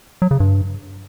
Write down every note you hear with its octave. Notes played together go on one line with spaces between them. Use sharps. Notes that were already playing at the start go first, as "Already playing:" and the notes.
F#3
C#3
G2